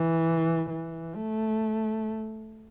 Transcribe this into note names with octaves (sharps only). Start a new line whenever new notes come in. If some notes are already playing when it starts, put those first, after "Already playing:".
Already playing: E3
E3
A3